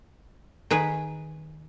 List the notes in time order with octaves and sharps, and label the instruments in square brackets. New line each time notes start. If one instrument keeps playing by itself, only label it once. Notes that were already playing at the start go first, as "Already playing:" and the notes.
[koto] D#3 G#4 B4